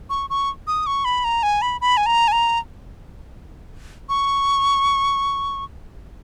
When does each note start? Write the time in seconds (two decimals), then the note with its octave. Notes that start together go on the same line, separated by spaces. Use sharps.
0.10 C#6
0.30 C#6
0.67 D#6
0.87 C#6
1.05 B5
1.24 A#5
1.43 G#5
1.62 B5
1.81 B5
1.97 G#5
2.06 A#5
2.28 G#5
2.32 A#5
4.09 C#6